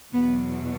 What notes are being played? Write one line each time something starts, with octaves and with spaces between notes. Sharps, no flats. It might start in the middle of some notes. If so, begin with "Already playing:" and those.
E2 B2 F#3 B3